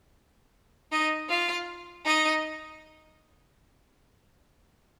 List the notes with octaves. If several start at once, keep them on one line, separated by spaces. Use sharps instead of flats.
D#4 D#5
F4 F5
D#4 D#5